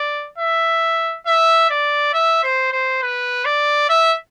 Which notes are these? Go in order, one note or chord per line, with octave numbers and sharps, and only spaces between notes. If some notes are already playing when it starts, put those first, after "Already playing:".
Already playing: D5
E5
E5
D5
E5
C5
C5
B4
D5
E5